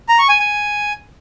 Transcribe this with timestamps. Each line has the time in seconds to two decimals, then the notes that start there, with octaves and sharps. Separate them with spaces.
0.09 A#5
0.19 C#6
0.29 G#5
0.39 G#5